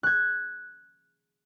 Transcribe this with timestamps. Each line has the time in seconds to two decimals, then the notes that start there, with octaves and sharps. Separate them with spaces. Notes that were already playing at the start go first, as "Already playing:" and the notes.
0.03 F#6 G#6